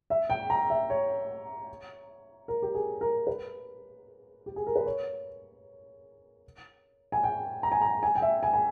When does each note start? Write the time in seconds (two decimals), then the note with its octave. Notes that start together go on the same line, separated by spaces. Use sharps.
0.10 E5
0.30 G5
0.50 A#5
0.70 E5
0.90 C#5
2.48 A#4
2.62 G4
2.75 G#4
3.01 A#4
3.27 B4
4.46 G4
4.56 G#4
4.67 A#4
4.76 B4
4.86 C#5
7.12 G#5
7.23 G5
7.63 A#5
7.72 G#5
7.81 A#5
8.03 G#5
8.15 G5
8.22 E5
8.43 G#5
8.53 G#5